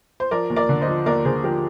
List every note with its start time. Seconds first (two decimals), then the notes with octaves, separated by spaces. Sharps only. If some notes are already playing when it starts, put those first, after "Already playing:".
0.20 C5
0.31 F3 A#4 D5
0.50 D#2
0.56 A#4 D5
0.69 D3
0.81 C5 D#5
0.88 F3
1.06 D#2 A#4 D5
1.25 D3 G#4 C5
1.44 F3 G4 A#4